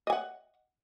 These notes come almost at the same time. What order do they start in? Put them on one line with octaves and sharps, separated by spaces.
D#5 G#5 F#5